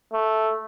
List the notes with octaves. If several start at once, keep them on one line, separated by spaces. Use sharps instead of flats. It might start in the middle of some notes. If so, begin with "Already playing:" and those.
A3